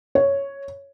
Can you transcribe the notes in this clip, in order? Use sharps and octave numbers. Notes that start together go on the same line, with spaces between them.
C#5